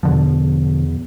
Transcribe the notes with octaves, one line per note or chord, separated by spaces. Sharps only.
E2 B2 D3 F3